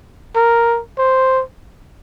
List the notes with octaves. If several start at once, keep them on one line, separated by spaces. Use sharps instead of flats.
A#4
C5